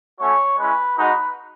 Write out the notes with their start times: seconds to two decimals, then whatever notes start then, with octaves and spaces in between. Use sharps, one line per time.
0.19 A3 C#4 F#4 C#5
0.58 G#3 C#4 E4 B4
0.98 G#3 D#4 F#4 B4